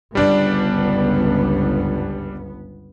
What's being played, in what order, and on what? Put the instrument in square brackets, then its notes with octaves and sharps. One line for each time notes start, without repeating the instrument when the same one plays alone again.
[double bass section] G1 C#2 B3 [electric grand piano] G3 D4 D5